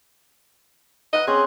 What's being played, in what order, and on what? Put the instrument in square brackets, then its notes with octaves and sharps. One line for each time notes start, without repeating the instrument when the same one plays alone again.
[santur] B4 F#5 [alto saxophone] D#5
[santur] C4 C#4 [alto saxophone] G#4